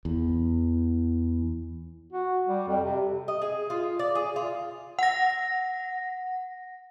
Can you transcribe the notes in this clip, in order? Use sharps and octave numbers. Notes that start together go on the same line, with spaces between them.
E2
F#4
G3
F2
C3
D#5
G#4
F4
D5
G#4
F4
F#5 A#6